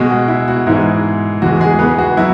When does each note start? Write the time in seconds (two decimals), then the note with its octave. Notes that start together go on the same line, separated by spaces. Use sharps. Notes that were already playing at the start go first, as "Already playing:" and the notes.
Already playing: B2 G#3 F#4
0.10 F#4
0.28 E4
0.48 F#4
0.67 G#2 E3 G#3 E4
1.42 E2 E3 G#3 F#4
1.60 G#3 G#4
1.79 B3 B4
1.98 F#4
2.17 F#3 E4